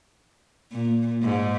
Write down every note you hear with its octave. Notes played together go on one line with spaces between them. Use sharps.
A#2
G#2